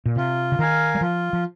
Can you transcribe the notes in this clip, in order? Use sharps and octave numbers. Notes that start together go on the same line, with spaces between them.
A#2
C3 F4
C#3
D#3 A#4 F5 G#5
G3
F3 F4
F3